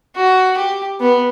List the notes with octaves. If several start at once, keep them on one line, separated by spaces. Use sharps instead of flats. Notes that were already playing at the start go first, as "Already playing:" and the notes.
F#4
G4
B3